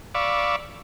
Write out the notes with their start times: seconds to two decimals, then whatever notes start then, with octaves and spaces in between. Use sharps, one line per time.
0.15 D5 F5 B5 C#6 D6 E6